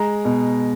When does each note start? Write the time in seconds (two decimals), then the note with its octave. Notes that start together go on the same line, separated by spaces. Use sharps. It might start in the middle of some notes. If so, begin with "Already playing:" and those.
Already playing: G#3 A#5
0.25 B2